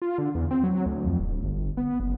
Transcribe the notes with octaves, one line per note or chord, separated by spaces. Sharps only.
F4
D3
E2
C4
F#3
D2
F2
D1
G1
B3
F#1